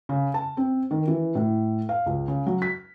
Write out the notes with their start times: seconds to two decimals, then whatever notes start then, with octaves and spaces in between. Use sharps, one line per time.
0.09 C#3
0.34 A5
0.57 C4
0.91 D#3
1.08 E3
1.35 A2
1.89 F5
2.06 C#2
2.28 C#3
2.47 F#3
2.62 B6